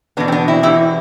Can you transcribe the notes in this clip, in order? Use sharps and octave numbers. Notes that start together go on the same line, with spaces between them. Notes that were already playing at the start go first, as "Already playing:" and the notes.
E2 B2 B3 D4
C4
B3 D4
C4 E4
E2 B2 E4 G4